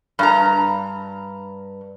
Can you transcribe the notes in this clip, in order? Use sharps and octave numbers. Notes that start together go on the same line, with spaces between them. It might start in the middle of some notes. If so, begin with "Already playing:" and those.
G2 A#5